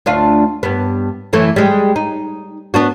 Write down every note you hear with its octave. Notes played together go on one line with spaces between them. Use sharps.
D2 D4 F4
G2 B3
F#2 E3 A3
G3 G#3
D#4
B3 D4 F#4